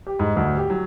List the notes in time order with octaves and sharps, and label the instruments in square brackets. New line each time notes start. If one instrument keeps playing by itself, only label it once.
[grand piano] G4
G#2
D2
G4
F#3